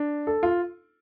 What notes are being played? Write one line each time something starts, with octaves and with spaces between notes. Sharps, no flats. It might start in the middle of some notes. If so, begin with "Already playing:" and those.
Already playing: D4
A4
F4